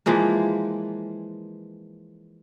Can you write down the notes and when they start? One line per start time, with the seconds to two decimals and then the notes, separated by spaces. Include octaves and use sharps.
0.06 E3 F3 G#3 A#3